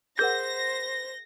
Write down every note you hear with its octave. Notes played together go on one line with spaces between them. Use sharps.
G#4 A#4 C5 F#5 G6 A#6